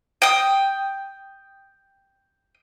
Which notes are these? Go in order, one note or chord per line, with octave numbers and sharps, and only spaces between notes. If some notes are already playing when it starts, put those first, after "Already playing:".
G5 D#6